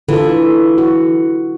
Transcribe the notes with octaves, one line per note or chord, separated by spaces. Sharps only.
D3 E3 F4 A4
F#4